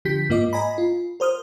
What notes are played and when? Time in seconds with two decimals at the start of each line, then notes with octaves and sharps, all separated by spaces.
0.05 D3 F3 G4 G6 B6
0.30 G#2 A#3 F4 D#5 D6
0.53 D#5 G#5 A#5 B5
0.78 F4
1.20 A#4 C5 D#6 F6